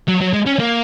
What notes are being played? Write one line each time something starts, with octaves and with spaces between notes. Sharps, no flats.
F#3
F#3
G#3
C#4
A#3